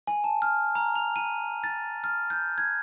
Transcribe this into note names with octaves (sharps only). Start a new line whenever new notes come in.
G#5
A5
F6
A#5
F7
D#7
A6
F6
G6
G#6